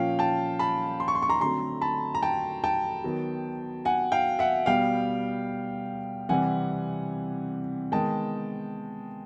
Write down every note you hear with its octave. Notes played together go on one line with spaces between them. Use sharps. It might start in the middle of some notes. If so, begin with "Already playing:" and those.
Already playing: A#2 F3 A#3 C#4 F5 G5
G5 A5
A5 B5
C6
C#6
C6
C#6
A#5 C6
D3 F#3 A3 C4 A#5 C6
A5 B5
A#5
G5 A5
G5 A5
D#3 F#3 B3
F#5 G#5
F5 G5
E5 F#5
B2 G3 B3 F5 G5
C3 E3 G3 C4 F#5 G#5
D#3 G#3 B3 G5 A5